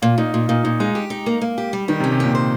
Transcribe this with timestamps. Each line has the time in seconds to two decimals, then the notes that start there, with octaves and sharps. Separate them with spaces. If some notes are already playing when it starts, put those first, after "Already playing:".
0.02 A#2 F4
0.18 A#2 D#4
0.33 A#2 F4
0.49 A#2 D#4
0.64 A#2 D#4
0.80 G#3 D#4
0.95 G4
1.10 D#4
1.26 A#3
1.41 A#3
1.58 G4
1.73 G3
1.88 D#3 G4
2.00 C3
2.04 C#4
2.12 C3
2.20 A#2 G4
2.35 C5